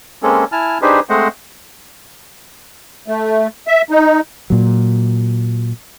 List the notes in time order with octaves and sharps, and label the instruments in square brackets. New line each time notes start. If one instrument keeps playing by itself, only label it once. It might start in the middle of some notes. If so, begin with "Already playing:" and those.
[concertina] G#3 A#3 C4 C#4 G#4 A4
E4 G#5 A5 F6
D4 D#4 G4 G#4 B4 C5
G#3 A3 C4 C5 D#5 F#5
[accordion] A3
E5
D#4
[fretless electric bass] A#2 F#3